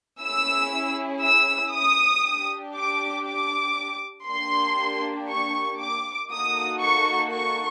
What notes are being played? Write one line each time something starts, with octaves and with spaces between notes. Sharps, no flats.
C#4 E4 G#4 E6
E6
D#6
D4 G4
D6
D6
A#3 D4 G4 C6
C#6
D6
A#3 D#4 F#4 A4 D#6
C#6
C#6